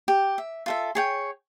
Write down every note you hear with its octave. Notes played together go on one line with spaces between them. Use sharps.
G4
E5
F4 A4 E5
G#4 C#5 G5